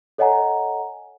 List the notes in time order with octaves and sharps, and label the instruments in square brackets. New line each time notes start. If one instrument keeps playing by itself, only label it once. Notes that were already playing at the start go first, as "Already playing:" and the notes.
[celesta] A4 C#5 D#5 F#5 G#5 A#5